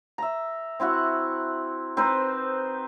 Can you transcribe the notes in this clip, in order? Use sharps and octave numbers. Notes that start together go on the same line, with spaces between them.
E5 A#5
C4 E4 F#4 F#5
C4 D#4 B4 C5